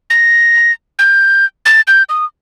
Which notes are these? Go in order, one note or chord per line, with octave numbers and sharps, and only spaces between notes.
A#6
G6
A6
G6
D#6